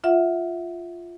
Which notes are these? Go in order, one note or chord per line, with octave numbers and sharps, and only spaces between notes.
F4 E5 F#5